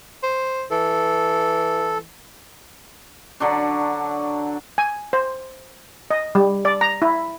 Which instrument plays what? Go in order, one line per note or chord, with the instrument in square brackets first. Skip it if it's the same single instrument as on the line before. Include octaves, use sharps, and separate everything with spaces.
[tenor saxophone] C5
[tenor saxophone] E3 [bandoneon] A4
[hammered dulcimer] D3 F#3 D4
[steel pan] G#5
C5
D#5
G3
D5
A#5
E4